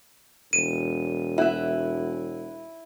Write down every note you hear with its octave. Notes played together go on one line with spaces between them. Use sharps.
E1 D#7
E4 F#4 E5